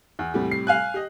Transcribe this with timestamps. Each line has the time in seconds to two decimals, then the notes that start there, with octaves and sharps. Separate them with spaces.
0.19 E2
0.34 A2 C3 G3
0.51 C7
0.67 F5 G#5 F#6
0.94 G4 D#5